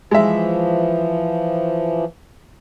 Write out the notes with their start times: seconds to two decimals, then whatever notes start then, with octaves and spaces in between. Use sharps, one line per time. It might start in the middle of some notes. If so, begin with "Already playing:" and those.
0.11 E3 F3 G#3 E5